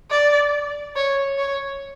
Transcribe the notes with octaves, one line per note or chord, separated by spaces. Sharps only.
D5
C#5
C#5